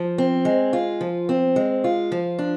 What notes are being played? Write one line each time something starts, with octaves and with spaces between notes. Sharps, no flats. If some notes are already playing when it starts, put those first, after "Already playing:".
Already playing: F3
C4
G#3
F4
F3
C4
G#3
F4
F3
D4